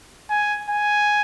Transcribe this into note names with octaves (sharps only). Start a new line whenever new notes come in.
G#5
G#5